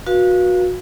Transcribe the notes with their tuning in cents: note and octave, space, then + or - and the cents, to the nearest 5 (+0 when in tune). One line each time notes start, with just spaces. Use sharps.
F#4 -25 B4 -35 F5 +0